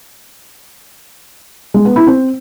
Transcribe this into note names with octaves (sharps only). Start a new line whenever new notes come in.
G#3
B3
E4
C4